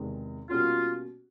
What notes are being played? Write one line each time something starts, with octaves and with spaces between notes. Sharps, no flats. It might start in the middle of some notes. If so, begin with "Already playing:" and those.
Already playing: E2 C3 D#3 G#3
B2 G3 A#3 C#4 F4 F#4